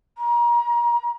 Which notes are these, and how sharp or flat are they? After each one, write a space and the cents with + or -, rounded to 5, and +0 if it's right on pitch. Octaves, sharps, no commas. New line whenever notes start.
A#5 +30